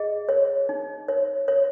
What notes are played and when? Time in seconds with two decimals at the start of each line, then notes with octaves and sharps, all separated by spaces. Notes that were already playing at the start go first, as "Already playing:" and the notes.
Already playing: G#4 D#5
0.29 C#5
0.69 D#4
1.08 C#5
1.48 C#5